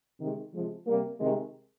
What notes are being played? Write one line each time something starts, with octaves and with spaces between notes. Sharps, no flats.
C3 D#3 G#3
C3 F3 G#3
C3 G3 A#3
C3 D#3 G#3